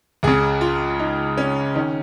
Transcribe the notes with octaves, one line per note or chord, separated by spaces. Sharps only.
C#2 C#3 G#4
F4
D#4
C#4
D#3 C#4